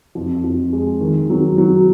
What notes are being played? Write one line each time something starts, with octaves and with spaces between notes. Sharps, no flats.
F2
F2
G#3
D#3
F#3
F#3